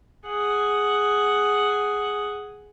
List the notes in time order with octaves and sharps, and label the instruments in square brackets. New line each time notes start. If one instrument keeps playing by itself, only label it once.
[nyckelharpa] G#4 F#5